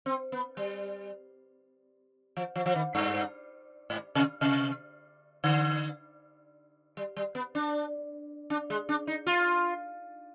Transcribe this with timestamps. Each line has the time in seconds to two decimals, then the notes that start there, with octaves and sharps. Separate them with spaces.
0.06 C4
0.32 B3
0.57 G3
2.37 F3
2.56 F3
2.66 F3
2.76 D#3
2.95 G2
3.90 G#2
4.15 C3
4.41 C3
5.44 D3
6.97 G3
7.17 G3
7.35 B3
7.55 D4
8.50 D4
8.70 G#3
8.89 D4
9.07 D#4
9.27 F4